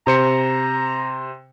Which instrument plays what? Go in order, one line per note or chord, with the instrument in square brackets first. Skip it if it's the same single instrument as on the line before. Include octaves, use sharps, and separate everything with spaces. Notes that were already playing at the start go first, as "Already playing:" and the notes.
[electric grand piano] C3 C5 C#7 [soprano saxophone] A#5